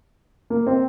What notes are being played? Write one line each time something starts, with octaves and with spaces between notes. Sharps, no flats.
A#3
C4